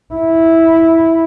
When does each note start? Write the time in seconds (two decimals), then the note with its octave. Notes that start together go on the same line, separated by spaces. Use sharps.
0.14 E4